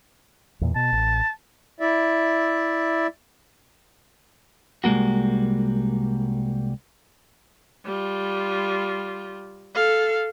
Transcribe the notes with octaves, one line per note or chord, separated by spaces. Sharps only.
E2 A#2
B2 A5
A1
E4 D5 E5
C2 G3 G#3 A#3 F#4
G3 F4
A4 F5